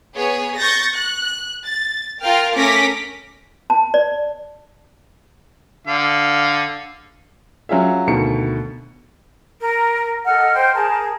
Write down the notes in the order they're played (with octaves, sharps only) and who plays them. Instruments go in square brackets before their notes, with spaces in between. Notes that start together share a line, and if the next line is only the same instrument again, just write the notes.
[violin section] B3 G#4 C#5
C#6 G6 A6 A#6
F#6
A6
F4 A#4 F5 G5 F6
A3 C#4 A#4 D6 A#6 B6
[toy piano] A5
D5
[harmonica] D3 F5
[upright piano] F#3 C#4 F4 G#4 E5
D2 B2 D#3 C#7
[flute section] A#4
A4 D#5 F#5 F6
C5 G5
G#4 A#4 A5